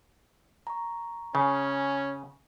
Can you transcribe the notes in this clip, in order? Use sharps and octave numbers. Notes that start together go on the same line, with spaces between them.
A#5 C#6
C#3 C#4